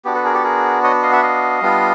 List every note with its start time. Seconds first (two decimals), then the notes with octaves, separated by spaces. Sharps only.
0.05 B3 D4 F#4 G4
0.14 A4 B4
0.25 G#4 A#4
0.34 G4 A4
0.44 G#4 A#4
0.83 C#5 D#5
1.02 D#5 F5
1.12 E5 F#5
1.22 D#5 F5
1.62 G3 B3 D4 F4